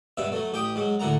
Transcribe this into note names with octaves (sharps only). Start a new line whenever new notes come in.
G2 B2 E5
F#3 A3
A1 G4 G5 D#6
G#2 F#3
D2 A2 D3 F#5 A#5